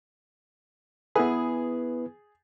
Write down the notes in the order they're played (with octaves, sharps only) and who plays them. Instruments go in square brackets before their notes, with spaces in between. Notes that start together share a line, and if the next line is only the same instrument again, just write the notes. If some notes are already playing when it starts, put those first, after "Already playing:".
[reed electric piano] B3 E4 B4 [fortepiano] G#4